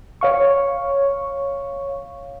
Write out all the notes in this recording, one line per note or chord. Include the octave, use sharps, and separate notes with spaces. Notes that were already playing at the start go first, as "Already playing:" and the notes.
C#5 F5 C#6